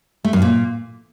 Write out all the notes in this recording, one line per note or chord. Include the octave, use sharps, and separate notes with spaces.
A3
F#2
A#2